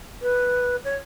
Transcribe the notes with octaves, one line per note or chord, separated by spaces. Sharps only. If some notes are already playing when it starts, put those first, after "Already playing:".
B4
C#5